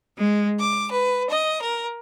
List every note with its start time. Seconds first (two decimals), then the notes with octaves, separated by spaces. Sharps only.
0.17 G#3
0.58 D6
0.90 B4
1.28 D#5
1.61 A#4